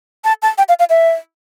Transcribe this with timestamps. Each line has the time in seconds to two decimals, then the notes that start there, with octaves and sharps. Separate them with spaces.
0.25 A5
0.42 A5
0.58 G5
0.69 F5
0.79 F5
0.90 E5